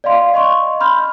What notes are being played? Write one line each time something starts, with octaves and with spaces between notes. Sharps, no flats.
D5 D#5 F5 C6
D#5 C6 C#6
B5 C6 F6 G6